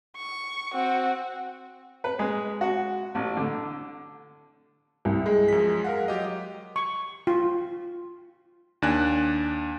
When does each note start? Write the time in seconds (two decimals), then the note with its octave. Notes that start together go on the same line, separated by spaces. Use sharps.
0.17 C#6
0.73 C4 F#4
2.04 B4
2.19 G#3
2.61 F#4
3.15 A1
3.37 D3
5.05 C2
5.26 G#3
5.48 F#2 F3 B6
5.84 A#4 F5 F#5
6.08 F#3 G4 D#5
6.76 C#6
7.27 F4
8.82 D#2 D4 G#5 F#6